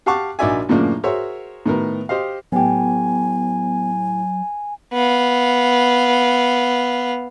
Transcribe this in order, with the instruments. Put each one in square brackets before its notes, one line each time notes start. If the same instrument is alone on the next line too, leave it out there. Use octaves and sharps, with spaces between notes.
[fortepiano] G4 F5 F#5 A5 C#6 D6
A#1 D#4 F#4 D5 E5 G#5
F#2 A2 C#3 F3 A#3 D4
F#4 G#4 A#4 C5 C#5 E5
A2 D#3 B3 A#4
G4 C5 D#5 F5
[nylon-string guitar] A2 G4 [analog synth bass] F#3 [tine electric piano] B3 [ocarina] G#5
[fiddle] B3 F5